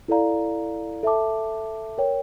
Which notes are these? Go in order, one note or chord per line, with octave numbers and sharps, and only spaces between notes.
E4 A4 D5 F5 A#5
A4 E5 A5 D6
A#4 C#5 G5